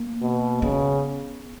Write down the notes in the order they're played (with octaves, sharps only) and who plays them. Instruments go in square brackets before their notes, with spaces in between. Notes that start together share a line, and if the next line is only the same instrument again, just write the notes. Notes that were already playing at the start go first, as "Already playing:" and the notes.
Already playing: [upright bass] A#3
[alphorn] B2
[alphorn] C#3 [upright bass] B3